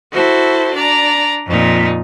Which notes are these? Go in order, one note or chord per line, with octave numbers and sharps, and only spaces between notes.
E4 F#4 A4 C5
D4 D5 A#5
F2 A#2 D#4